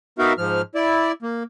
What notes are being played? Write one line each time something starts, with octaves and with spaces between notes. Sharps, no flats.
B3 D#4 F#4 A#4 E5 F5
G#2 F3 F6
E4 D5
A#3